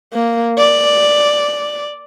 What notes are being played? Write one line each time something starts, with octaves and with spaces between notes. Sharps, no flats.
A#3
D5